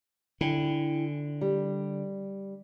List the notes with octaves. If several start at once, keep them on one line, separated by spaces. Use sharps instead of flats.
D3 E4 G5 G#5
G3